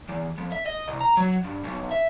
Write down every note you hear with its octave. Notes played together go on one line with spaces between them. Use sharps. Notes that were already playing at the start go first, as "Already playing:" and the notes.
E2
F2
E5
D#5
C2
A#5
F#3
G2
B1
E5